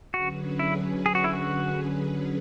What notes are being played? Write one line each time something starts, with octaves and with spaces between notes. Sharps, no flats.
D3 F#3 C#4 F#4 G#4 B4
E4
G#4
F#4
E4
F#4